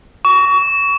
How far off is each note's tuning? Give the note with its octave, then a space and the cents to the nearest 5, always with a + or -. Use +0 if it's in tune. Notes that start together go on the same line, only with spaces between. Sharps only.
C#6 +30